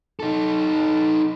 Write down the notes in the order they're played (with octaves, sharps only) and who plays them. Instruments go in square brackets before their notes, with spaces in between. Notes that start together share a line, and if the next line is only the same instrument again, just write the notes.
[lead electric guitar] D#4 A4